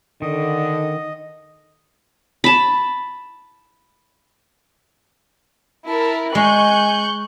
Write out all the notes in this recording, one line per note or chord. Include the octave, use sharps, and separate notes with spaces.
D3 D#3 D#5
A5 B5
E4 A#4 A5
G#3 G#5 C#6 F#6 G6